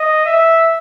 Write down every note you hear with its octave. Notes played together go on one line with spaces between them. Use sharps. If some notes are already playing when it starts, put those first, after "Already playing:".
Already playing: D#5
E5